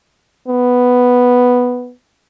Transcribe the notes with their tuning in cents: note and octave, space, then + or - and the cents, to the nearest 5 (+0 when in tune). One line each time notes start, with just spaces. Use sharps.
B3 +0